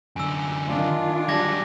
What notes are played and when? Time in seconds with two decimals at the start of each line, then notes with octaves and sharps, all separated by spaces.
0.16 F#2 D3 G#5 E6
0.69 D#3 D4 F4
1.28 F#3 G3 D6 G#6 A#6